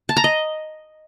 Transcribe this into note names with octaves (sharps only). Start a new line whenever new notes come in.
A5
A#5
D#5